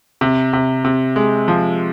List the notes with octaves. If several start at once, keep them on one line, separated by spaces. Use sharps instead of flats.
C3
C3
C3
G#3
F3